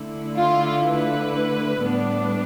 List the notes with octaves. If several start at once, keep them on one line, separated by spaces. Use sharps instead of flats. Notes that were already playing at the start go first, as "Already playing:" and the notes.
Already playing: D3 A3 E4
F4
B4
A2 G3 B3 D4